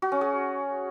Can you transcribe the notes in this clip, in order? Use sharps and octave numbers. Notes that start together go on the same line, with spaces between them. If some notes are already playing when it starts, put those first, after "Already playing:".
F#4
C#4
G#4